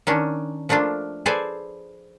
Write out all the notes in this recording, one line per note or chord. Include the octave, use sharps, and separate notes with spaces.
D#3 C#4 D4
F3 A3 A#3 D4 F4
G#4 A4 B4 C5 D5 G#5